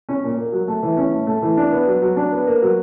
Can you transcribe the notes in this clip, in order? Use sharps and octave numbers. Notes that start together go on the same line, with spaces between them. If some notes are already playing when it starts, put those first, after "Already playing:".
C#4
A#2
A#3
F#3
A3
E3
C#4
A2
A3
E3
D4
B3
F#3
F#3
D4
B3
A#3
F#3